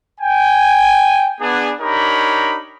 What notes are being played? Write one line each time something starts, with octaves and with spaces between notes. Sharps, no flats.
G5 G#5
B3 D4 G#4
D4 D#4 G4 A#4 C#5 B5